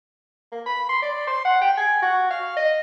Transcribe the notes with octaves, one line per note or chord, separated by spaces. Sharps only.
A#3
B5
C6
D5
C6
F#5
G5
G#5
F#4
F5
D#5